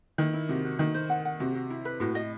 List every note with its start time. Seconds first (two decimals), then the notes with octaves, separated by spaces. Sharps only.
0.18 D#3 E4
0.33 E4
0.49 C3 F#4
0.65 F#4
0.79 D#3 D#4
0.94 C5
1.10 F#5
1.25 F#5
1.40 C3 F#4
1.55 F#4
1.70 E4
1.85 B4
2.00 A2 F#4
2.15 D#5